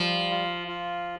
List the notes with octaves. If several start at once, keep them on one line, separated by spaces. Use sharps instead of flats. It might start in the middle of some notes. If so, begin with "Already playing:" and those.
Already playing: F3 G3
F4
F4